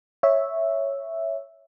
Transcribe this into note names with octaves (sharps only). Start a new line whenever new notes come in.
C#5 E5